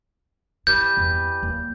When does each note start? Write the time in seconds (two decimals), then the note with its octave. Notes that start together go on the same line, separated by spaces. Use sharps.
0.67 E3 G3 E4 F5 G6
0.97 E2
1.43 D#2